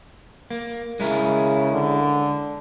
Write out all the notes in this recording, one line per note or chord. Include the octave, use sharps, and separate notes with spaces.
A#3
C#3 G#3 E4 A#4
D3